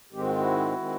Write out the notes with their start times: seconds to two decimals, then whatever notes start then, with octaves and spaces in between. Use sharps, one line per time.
0.13 G#2 D#3 G#3 C4 G4
0.21 F#4
0.29 F4
0.38 E4 F#4
0.76 D#3 G#3 C4